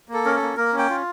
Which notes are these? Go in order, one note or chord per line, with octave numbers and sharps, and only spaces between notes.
A#3
A4
C#4 A#4
A4
A#3
A#3 A#4
C#4
G5
F4